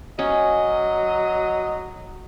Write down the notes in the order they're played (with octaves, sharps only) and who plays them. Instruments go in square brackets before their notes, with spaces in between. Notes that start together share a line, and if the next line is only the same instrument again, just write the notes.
[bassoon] F#3 [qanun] C#4 [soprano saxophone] D#5